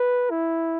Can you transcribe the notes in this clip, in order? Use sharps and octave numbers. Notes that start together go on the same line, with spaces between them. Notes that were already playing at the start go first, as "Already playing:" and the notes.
Already playing: B4
E4